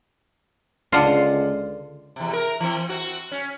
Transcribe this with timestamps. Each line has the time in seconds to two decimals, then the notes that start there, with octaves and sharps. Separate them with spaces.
0.92 C#2 D3 F4
2.16 E2 C3
2.33 A#4
2.60 E3 C4
2.89 C4 F#4
3.32 C#4